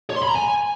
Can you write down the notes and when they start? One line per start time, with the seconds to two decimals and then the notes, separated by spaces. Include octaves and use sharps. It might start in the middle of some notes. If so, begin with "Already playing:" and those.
0.10 C#5
0.16 C6
0.23 B5
0.29 A#5
0.35 G#5